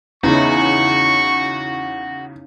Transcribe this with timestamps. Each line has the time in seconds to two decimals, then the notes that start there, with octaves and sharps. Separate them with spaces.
0.24 E2 C#3 C#4 D#4 E4 F#4 C#6